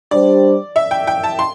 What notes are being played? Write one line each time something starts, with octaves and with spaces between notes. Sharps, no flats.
G3 D4 G4 C5 D5
E5
G5
G5
A5
C6